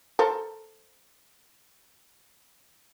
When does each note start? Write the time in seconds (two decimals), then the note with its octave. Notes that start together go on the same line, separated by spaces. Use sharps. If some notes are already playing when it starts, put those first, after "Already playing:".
0.19 A4 A#4 C5